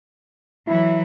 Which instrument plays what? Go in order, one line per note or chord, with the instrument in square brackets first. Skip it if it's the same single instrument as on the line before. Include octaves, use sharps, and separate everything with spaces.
[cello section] E3 F#3 [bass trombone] E4